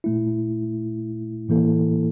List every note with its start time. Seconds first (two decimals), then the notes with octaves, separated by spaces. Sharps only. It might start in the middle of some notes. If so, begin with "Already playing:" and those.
0.04 A#2 A3 E4
1.49 A2 E3 A#3 E4 A4